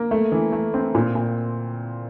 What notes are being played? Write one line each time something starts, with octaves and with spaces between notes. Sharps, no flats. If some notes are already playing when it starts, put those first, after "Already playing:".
Already playing: A#3
A3
E3
A3
C4
A#2
A#2